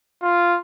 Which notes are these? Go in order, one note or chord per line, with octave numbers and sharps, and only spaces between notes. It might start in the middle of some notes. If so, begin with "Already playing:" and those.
F4